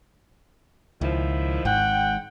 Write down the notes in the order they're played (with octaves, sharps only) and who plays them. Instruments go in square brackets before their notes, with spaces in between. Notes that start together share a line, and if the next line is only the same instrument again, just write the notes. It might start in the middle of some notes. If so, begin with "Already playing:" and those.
[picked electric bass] C#2 [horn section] D#3 F3 E4
[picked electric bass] G#1 G#2 [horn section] F#5 G5